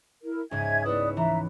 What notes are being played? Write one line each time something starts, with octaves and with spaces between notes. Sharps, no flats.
E4 A#4
C#2 G#2 E5 G#5 G#6
B3 E4 B4 D5 D#6
E3 E5 A#5